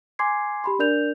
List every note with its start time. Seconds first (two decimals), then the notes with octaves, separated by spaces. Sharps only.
0.19 G#5 C6 D6 G#6 C7
0.64 G4 B5 C6
0.79 D4 A#4 D5 G6 F7